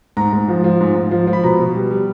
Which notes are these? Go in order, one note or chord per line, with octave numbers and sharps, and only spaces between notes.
G#2 A#5
G#2
F3
F3
G#2
G#2
F3
F3
B5
B2 A#5
B2
G3
G3